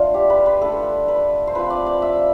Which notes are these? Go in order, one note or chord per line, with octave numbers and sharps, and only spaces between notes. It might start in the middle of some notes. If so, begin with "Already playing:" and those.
Already playing: A3 D4 F4
G4
B4
B4
A3 D4 F4 A4
B4
C5
F3 C4 F4 B4
D5
D5
E5